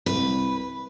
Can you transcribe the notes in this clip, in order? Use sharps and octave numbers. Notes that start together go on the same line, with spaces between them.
C2 B4